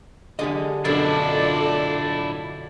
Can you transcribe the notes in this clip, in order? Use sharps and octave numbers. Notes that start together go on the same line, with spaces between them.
D3 G4 G#4 D#5
F#2 B2 D3 D4 E4 F4 A4 D5